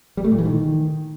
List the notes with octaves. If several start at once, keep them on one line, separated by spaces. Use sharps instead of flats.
G3
A3
A#2
E3
D#3